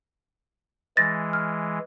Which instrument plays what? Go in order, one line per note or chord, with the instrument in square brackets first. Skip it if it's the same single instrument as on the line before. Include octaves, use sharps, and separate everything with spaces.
[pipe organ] E3 G#3 [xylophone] A6 A#6
[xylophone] F6